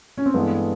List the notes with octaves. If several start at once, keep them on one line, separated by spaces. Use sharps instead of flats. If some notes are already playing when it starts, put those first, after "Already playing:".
C#4
C4
G2 E3 G#3 A3 B3